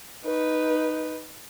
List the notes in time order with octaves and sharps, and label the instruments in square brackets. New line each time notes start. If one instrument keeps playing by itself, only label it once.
[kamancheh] D#4 B4